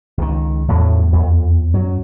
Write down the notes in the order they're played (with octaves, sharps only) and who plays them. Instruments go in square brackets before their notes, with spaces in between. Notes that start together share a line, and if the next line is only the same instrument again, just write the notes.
[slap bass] C#2 D#3
[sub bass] E2 [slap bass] A2 F3 F#3
[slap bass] F2
[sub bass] F#2 [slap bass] F#3